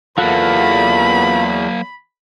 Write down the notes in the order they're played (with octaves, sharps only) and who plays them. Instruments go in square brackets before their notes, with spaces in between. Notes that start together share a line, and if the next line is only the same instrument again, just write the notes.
[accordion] E2 [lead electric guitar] F#3 A#3 [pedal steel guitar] F4 A4 F#5 [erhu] B5